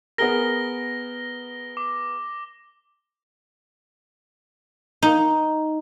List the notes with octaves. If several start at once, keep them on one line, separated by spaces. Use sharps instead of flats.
B3 G#4 A#4 A#6 G7
D6
D#4